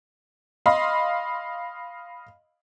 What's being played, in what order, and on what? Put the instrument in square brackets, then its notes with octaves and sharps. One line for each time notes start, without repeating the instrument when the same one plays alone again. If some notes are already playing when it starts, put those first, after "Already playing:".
[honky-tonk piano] D#5 F5 B5 C6